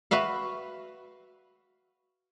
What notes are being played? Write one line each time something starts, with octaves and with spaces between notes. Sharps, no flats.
F#4 B4 E5 F5